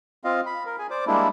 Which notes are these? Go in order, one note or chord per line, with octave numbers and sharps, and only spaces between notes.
C4 F4 D#5 F5
B5
A#4
G#4 G#5
C5 D5 D6
G3 G#3 A#3 D4 E4